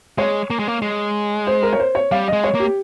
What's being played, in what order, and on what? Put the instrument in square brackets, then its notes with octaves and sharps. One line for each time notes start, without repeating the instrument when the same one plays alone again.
[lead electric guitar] G#3 [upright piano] C#5
[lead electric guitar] A#3
G#3
A#3
G#3
[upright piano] C5
A#4
C#5
C5
C#5
[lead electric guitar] G3 [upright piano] F5
[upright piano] D#5
[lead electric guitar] G#3
[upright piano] C#5
[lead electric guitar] A#3
[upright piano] G4